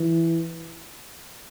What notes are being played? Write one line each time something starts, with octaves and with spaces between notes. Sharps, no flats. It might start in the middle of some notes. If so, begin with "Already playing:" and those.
Already playing: E3